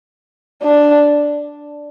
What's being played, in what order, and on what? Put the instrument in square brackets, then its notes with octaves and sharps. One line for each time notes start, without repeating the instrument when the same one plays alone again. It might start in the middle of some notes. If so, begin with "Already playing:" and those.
[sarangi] D4